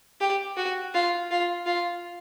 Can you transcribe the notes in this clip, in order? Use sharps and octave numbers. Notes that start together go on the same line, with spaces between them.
G4
F#4
F4
F4
F4